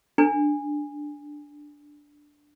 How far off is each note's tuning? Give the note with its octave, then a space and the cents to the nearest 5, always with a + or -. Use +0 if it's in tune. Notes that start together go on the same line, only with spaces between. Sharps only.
D4 +0 G#5 -15